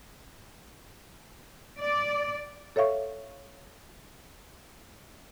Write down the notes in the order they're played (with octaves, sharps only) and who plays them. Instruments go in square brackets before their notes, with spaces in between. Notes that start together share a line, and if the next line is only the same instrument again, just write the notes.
[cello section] D5
[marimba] A4 C#5 E5 F5 C#6